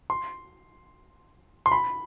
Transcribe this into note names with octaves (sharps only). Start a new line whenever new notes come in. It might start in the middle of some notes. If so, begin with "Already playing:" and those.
C6
C6
B5